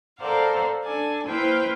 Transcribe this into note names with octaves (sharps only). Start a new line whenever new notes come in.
A4 A#4 C5 D5 F5 F#5
D4 A4 D5 G#5 A5
A#3 E4 B4 C5 G5 F6